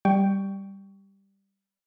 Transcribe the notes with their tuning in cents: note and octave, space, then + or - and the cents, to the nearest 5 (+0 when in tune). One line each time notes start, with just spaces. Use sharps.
G3 +0 G5 +0 C#6 +15